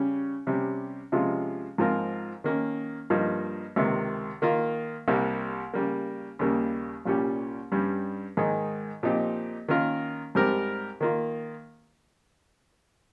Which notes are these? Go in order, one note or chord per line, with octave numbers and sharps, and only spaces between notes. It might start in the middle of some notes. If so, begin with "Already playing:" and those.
Already playing: C#3 G3 C#4
C3 G3 C#4
C3 F3 G#3 C#4 F4
G#2 F3 C4 F4 A#4
D#3 A#3 C#4
G2 F3 A#3 D#4
C#2 C3 D#3
D#3 A#3 F4
C2 C3 G3 A#3
C#3 G3 A#3
D#2 C#3 G3 A#3
C2 A#2 G3 C#4 G4
G2 G3 C#4
G#2 D#3 G#3 D#4
A#2 F3 C4 D#4 G4
D#3 A#3 C#4 F4 A#4
G#2 G3 C4 G4 A#4
D#3 A#3 F4